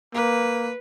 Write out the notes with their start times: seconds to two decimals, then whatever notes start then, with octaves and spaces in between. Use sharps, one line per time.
0.15 A#3 B4